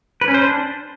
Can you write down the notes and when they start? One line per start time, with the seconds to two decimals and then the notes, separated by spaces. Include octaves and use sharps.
0.21 B4
0.28 C#4
0.34 C5
0.41 D4